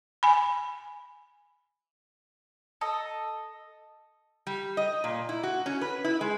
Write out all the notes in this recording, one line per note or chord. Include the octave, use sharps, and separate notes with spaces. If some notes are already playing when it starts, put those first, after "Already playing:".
G#5 B5
A4 D#5
G3
D#5
A#2
E4
F#4
C#4
B4
E4
G#3